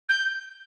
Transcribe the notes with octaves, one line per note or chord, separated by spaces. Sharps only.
G6